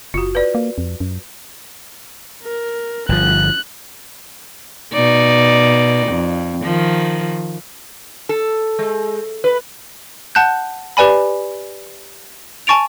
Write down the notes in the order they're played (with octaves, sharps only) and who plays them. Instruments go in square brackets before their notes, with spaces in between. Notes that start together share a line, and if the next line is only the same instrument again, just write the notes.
[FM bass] F#1 [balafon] F4 F#4
[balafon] B4 D5
[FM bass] A#3
F2
F#2
[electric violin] A#4
[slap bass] G1 F3 [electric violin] F#6
[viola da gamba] B2 D#4 D5
F2
D#3 F3
[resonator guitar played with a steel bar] A4
[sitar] G#3
B4
[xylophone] F#5 A5 F#6 G6
G4 B4 D5 G#5 B5
G#5 A5 C#6 A6 D7 F7